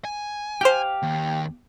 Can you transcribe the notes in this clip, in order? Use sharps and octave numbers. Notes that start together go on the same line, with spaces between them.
G#5
G4 C5 F5 G5
D#2